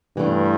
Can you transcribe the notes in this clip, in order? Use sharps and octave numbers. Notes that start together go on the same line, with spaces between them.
G2 E3 A3 D4